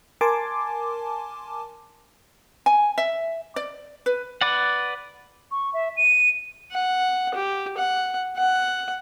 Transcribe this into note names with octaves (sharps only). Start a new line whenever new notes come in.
A#4 G#5 A5 C6 D6
G#5
E5
D5
B4
B4 D5 F#5
C#6
E5
D#7
F#5
G4
F#5
F#5